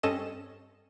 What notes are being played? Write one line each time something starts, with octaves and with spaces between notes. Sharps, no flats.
G2 C4 C#4 A4 D#5 E7